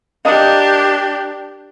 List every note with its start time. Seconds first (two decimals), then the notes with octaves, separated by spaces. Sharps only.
0.25 D4 G4 A#4 D#5 F5